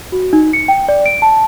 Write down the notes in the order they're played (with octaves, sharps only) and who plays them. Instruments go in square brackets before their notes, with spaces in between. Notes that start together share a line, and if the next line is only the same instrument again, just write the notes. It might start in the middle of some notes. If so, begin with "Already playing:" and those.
[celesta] F#4
D#4
C#7
G5
D5
D7
A5